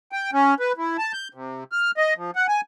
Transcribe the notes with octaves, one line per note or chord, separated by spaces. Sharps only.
G5
C#4
B4
E4
A5
G6
C3
F6
D#5
F3
F#5
G#5